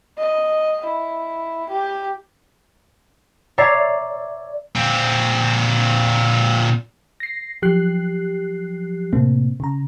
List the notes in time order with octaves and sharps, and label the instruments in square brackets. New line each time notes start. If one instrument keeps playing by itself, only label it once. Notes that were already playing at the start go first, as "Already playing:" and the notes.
[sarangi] D#5
E4
G4
[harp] C#5 D5 E5 A#5 A6 C7
[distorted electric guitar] A#2 C4
[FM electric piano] A#6 C7
F3 F#3 G4 F#6 C7
A2 C3 A#3 C4
C#3 A#5